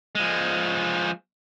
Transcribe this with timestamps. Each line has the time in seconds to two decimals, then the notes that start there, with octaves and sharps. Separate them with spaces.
0.15 F3 G#3